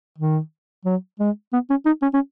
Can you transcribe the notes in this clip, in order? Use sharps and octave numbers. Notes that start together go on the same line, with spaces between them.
D#3
F#3
G#3
B3
C#4
D#4
C#4
C#4